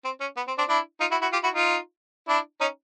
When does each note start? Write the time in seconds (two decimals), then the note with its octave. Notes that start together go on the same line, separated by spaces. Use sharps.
0.05 C4
0.21 C#4
0.37 B3
0.48 C4
0.58 C4 D4
0.68 D4 E4
1.00 D#4 F4
1.11 E4 F#4
1.22 E4 F#4
1.33 F4 G4
1.43 E4 F#4
1.54 D#4 F4
2.28 D4 E4
2.61 C#4 D#4